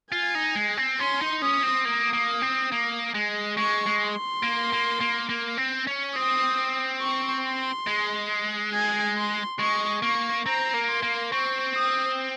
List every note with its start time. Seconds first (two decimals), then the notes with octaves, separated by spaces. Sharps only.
0.12 F4 G#5
0.35 D#4
0.56 G#3
0.77 C4
0.99 C#4 C6
1.21 D#4
1.42 C#4 D#6
1.63 C4
1.85 A#3 D#6
2.13 A#3
2.42 C4
2.72 A#3
3.14 G#3
3.57 G#3 C#6
3.86 G#3
4.00 C6
4.43 A#3
4.73 A#3
5.01 A#3
5.29 A#3
5.58 C4
5.87 C#4
6.16 C4 D#6
7.01 C#6
7.45 C6
7.87 G#3
8.73 G#5
9.17 C6
9.59 G#3 C#6
10.02 A#3 C#6
10.46 C4 A#5
10.74 A#3
10.88 C6
11.03 A#3
11.31 C4 C#6
11.75 D#6